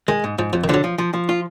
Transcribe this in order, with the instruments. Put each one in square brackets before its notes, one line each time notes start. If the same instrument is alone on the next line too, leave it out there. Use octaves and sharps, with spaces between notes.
[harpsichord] D#3 [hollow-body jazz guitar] G#3
[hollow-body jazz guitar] G#2
[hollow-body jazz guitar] G#2 [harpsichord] F3
[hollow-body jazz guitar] F2 [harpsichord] F3
[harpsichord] D#3
[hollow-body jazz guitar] D3 [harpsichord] F3
[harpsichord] F#3
[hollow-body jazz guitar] F3
F3
F3
F4